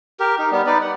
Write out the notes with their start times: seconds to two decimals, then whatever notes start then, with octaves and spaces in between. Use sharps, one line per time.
0.20 G4 A#4
0.39 D#4
0.51 G3 B3
0.66 D#4 B4 D5
0.81 F#5